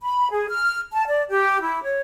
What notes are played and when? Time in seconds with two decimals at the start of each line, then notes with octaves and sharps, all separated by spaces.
0.01 B5
0.32 G#4
0.50 F6
0.92 A5
1.08 D5
1.29 G4
1.62 E4
1.83 C#5